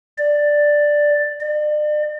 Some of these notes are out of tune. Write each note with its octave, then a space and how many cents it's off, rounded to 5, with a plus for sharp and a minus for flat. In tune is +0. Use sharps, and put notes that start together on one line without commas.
D5 +5
D5 +40